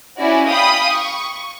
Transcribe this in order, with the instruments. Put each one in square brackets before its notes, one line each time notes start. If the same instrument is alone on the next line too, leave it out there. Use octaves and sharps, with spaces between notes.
[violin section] C#4 E4 F#4 D5
F5 G5 B5 D#6
C#6